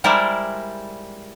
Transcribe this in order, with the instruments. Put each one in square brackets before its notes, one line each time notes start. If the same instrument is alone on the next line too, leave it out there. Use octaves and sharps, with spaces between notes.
[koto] G3 G#3 E4 A#4 C5 D5